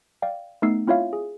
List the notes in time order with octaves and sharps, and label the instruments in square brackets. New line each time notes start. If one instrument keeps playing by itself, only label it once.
[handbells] D5 F5 G5
A3 B3 D#4 E6 C7
C4 E4 F4 C#5 E5 F5
G#4